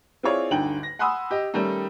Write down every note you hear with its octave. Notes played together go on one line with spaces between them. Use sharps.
C4 E4 F4 G#4 C#5 D5
G1 D2 D3 D#4 G5 F#7
A#6
F#5 G#5 B5 C6 D#6 E6
G4 D#5
D#3 G3 A3 C#4 D#4